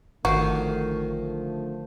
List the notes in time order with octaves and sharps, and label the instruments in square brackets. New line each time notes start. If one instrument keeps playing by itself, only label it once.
[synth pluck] G#1 C7 [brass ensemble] D3 F3 A3 [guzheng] D#3 [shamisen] F#4